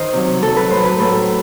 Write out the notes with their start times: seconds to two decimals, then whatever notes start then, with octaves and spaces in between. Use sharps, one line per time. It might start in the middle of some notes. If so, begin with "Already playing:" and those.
Already playing: D#3 C5 D#5
0.13 C3 F#3
0.42 C3 F#3 A4
0.56 B4
0.70 A2 F#3 C5
0.85 B4
0.99 A2 F#3 A4